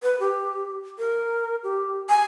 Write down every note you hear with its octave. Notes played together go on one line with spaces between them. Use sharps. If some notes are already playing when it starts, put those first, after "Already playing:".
B4
G4
A#4
G4
G#5